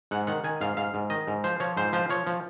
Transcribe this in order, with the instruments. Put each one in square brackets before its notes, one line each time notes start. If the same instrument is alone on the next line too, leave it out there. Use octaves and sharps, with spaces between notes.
[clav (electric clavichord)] G#2 F#5
D#3 F#5
D#3 G#5
G#2 F5
G#2 F5
G#2
D#3 D#5
G#2
F3 C5
F3 C#5
G#2 C5
F3 C5
F3 C#5
F3